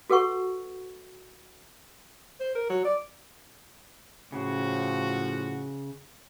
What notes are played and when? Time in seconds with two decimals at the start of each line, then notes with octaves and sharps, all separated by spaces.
0.10 F#4 A4 B4 F#5 C#6
2.40 C5
2.55 A#4
2.70 F#3
2.85 D5
4.32 A2 C#3 F3 F#4